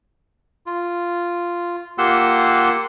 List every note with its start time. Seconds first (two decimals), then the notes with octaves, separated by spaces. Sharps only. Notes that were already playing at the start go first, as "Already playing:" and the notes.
0.66 F4
1.98 A#3 F4 G4 F#5 C6 E6